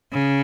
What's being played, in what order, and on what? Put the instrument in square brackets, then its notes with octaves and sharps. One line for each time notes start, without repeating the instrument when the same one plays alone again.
[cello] C#3